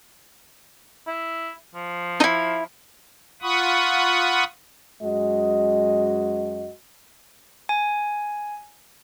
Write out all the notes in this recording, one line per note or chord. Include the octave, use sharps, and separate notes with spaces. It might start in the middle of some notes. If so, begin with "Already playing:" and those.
E4
F3
D#4 E4
F4 F#5 B5 C#6 D#6
F#2 G#3 F#4 D#5
G#5